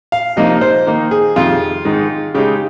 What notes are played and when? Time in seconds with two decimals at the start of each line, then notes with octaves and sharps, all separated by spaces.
0.12 F5
0.36 C3 F3 A#3 D#4 D#5
0.61 C5
0.86 D#3 A#3 D#4
1.11 G#4
1.36 F2 C3 D#3 F4
1.85 G#2 D#3 G#3 D#4
2.34 C#3 G#3 D#4 G4